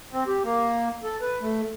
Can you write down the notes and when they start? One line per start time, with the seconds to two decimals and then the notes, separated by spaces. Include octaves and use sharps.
0.12 C4
0.27 G4
0.43 A#3
1.04 A4
1.22 B4
1.41 A3